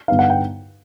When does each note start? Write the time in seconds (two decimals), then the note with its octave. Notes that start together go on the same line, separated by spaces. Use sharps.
0.08 G2 D3 G3 B3 D#4 F5
0.19 F#5
0.30 G5